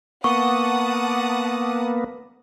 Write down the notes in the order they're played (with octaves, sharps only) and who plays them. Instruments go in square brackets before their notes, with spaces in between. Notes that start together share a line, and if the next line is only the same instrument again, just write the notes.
[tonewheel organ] A#3 B3 [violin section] F#5 A5 D#6 [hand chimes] C#6